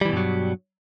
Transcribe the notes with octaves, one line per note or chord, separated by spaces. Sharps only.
G2 B2 E3 F#3 G3